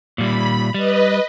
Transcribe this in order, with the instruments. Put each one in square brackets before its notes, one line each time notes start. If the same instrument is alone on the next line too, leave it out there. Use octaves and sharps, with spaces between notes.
[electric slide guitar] A#2 G3 [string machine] B5
[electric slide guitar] G3 [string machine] B4 D#5